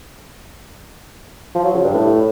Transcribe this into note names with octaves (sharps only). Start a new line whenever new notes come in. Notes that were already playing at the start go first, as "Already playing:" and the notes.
F3
F#3
C#3
G2
A2